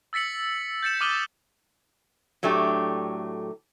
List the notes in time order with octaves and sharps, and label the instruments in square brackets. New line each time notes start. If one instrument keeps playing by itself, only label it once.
[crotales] E6 A6 B6 C#7 F#7
G6 A6 C#7 E7
D6 D#6 F6 D#7 F#7 G7
[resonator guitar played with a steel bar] A2 F#3 A3 D4 G4